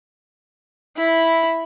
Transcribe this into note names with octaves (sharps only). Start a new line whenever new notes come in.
E4 B5